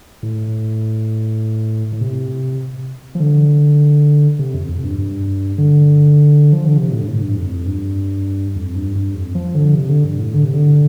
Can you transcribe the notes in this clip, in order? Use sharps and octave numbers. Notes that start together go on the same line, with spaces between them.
A2
A2
C3
F3
D3
C3
F2
F2
G2
G2
D3
F3
D3
C3
A2
G2
A2
G2
F2
G2
F2
G2
G2
F2
F3
D3
C3
D3
G2
A2
D3
C3
D3